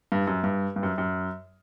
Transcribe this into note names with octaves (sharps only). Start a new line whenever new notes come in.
G2
F#2
G2
G2
F#2
F#2